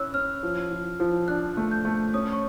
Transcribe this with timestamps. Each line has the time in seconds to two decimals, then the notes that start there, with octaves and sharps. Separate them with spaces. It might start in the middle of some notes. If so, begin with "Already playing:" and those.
Already playing: C#4 E4 E6 F#6
0.14 C#4 F6
0.43 F3
0.71 F3
1.00 F3
1.28 D4 F#6
1.57 A3
1.71 G6
1.85 A3
2.14 C#4 D#6
2.33 C#6